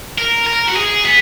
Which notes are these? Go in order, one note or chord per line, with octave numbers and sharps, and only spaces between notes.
A#4
A#4
F#4
G#4
B3